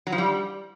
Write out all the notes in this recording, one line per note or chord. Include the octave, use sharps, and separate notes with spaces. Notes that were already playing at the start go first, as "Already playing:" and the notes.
F#3
F3
G3